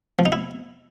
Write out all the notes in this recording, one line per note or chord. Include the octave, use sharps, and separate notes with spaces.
F3
D#4
E4